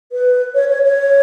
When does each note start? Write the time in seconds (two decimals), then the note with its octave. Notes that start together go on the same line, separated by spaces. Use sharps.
0.12 B4
0.55 C#5
0.69 C#5
0.83 C#5